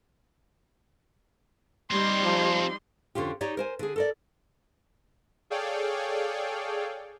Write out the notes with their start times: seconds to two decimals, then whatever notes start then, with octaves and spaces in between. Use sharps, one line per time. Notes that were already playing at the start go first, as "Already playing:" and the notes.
1.91 G3 C4 D#4 C#5 C6
2.23 F3
3.15 F2 D3 C#4 F4 G4
3.41 D#4 G4 C#5 D5
3.57 A#4 C5 G#5
3.79 D3 G#4
3.96 A4 A#4 D5
5.50 G#4 A4 C#5 D5 F5 G5